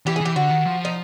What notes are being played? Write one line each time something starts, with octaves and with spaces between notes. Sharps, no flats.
E3 G4
G#4
E3 G4
D3 F#4
D#3
F3
D#4